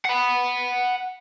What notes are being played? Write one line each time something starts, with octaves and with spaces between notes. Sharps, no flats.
F#5 B5